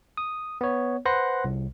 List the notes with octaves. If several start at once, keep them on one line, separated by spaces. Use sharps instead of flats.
D#6
B3 C#5
B4 C5 F#5 C6 F#6 A#6
C2